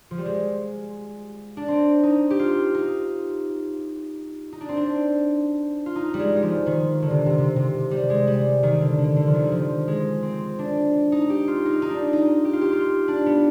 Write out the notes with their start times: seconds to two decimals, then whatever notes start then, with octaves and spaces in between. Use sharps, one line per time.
0.11 F3
0.18 G3
0.25 G#3
1.57 D4
1.68 C4
2.03 D#4
2.30 G4
2.39 F4
2.74 D#4
4.53 D#4
4.61 D4
4.69 C4
4.77 D4
5.86 F4
5.96 D#4
6.14 G3
6.19 G#3
6.36 G3
6.43 F3
6.66 D#3
7.02 D3
7.10 C3
7.26 C3
7.38 C3
7.56 C3
7.91 G3
8.10 G#3
8.27 G3
8.63 D#3
8.81 D3
8.98 D3
9.16 D3
9.27 F3
9.34 D#3
9.44 G3
9.52 F3
9.88 G#3
10.23 C4
10.59 D4
11.12 D#4
11.30 G4
11.48 F4
11.65 D#4
11.82 D#4
11.90 D4
12.13 D#4
12.45 G4
12.53 F4
12.61 G4
12.73 F4
13.08 D4
13.26 B3